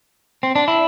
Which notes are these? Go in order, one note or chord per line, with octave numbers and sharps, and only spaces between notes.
C4
D4
E4